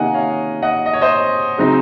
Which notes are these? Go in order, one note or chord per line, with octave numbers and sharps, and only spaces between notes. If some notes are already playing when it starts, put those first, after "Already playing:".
Already playing: C3 D#3 A#3 C#4 D#5 F5 F#5 G#5
C#5 F5
D#5 F#5
D#5
C#5
C5 D#5
C#3 F#3 C4 D#4